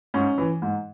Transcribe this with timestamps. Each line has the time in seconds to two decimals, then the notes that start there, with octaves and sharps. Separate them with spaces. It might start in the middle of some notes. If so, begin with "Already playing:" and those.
0.14 G#2 C#4
0.38 E3
0.62 G#2